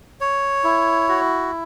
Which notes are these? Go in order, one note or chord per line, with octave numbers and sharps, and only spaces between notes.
C#5
E4
F#4